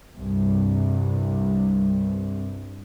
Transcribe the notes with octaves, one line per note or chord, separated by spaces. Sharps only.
C2 G2